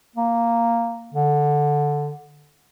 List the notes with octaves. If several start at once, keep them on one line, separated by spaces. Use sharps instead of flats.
A#3
D3